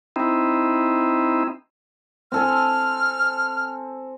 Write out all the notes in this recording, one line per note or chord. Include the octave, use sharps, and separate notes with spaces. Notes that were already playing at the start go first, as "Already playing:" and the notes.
C4 D#4 E4
C4 A4 G#5 F6